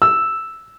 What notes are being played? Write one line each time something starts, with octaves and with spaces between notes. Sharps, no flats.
E6